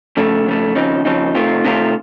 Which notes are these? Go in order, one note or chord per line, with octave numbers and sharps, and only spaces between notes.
F2 C#3 A3
F2 C#3 A3
D#2 C#3 F3 C4 D#4
D#2 C#3 F3 C4 D#4
C3 D#3 A3 C4 F4
C3 D#3 A3 C4 F4